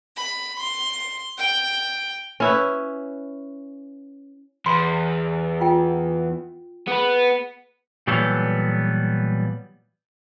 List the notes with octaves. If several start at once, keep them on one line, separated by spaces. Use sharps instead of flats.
B5
C6
G5
C#4 E4 B4
E2 B5 C6
F4 G5
B3 G#4 B4
A#2 E3 F#3 G3 B3 A4